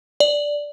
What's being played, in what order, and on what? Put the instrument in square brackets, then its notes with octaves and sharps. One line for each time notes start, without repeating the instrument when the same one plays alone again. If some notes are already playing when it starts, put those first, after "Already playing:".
[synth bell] D5